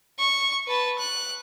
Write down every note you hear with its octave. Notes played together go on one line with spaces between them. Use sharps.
C#6
B4 A5
F#6